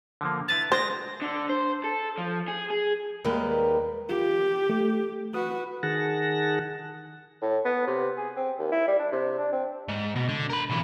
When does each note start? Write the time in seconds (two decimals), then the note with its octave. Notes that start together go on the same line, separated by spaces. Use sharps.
0.21 D3 F3 A#3
0.48 E4 B4 A#5 A6
0.72 G#3 D4 C5 A#6
1.22 D3
1.50 C5
1.84 A4
2.18 F3
2.48 G#4
2.70 G#4
3.24 D#2 D#3 G3 G#3 A#4 B4
4.09 F4 G4
4.69 A3
5.34 F#4 B4 D#6
5.83 D#3 G#4 F#5 A5 A#6
7.42 A2
7.65 B3
7.87 C3
8.17 G#4
8.37 C4
8.59 D#2
8.72 E4
8.88 G3
8.99 D4
9.12 C3
9.38 D4
9.53 C4
9.89 G#2
10.16 B2
10.29 D3
10.50 A#4 B5
10.70 B1 E3